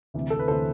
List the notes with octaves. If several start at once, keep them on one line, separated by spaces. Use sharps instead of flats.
D2 C3 E3
A4
B4
D2 C3 E3 A4 C5